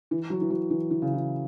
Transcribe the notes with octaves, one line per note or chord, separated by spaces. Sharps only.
E3
F#3
E3
F#3
E3
E3
C#3
E3